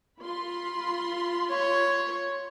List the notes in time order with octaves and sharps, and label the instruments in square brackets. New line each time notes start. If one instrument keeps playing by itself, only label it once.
[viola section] F4 B5 C6
[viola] C#5